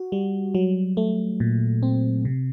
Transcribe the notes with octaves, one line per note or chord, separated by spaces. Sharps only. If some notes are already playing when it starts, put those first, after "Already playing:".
Already playing: F#4
G3
F#3
A3
A#2
C4
C3